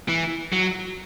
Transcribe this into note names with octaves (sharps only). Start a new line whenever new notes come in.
E3
F#3